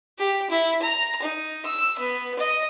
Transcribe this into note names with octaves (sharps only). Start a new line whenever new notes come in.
G4
E4
A#5
D#4
E6
B3
D#5